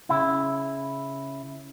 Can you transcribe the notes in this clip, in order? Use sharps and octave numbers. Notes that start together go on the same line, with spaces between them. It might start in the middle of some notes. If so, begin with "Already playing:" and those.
C#3 E4